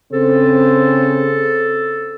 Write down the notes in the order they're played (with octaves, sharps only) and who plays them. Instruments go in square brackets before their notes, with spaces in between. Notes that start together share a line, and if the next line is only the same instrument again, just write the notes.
[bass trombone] C#3 [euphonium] C4 [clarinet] A4 [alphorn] C5